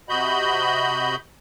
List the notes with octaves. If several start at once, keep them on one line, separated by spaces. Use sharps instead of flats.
C3 F#4 D#5 B5 G6